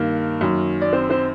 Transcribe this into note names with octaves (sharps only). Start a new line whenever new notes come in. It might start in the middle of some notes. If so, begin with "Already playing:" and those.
Already playing: G2 D#3 A#3 A#4
F#2 D#3
D5
C4 C5
C4 C5